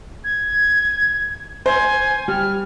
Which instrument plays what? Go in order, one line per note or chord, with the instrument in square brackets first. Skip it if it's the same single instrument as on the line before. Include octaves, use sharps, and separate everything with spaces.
[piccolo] G#6
[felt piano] C5 [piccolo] G#5
[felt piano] G3 [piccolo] F6